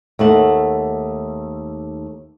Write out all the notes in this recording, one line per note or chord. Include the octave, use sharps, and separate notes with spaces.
D#2 A3 F#5